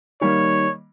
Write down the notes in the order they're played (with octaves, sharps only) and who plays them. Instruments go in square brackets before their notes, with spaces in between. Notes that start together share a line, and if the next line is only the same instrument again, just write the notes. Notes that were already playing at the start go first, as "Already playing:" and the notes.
[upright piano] D#3 G3 A#3 [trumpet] C#5